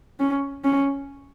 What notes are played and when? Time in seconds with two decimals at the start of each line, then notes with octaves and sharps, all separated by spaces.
0.20 C#4
0.64 C#4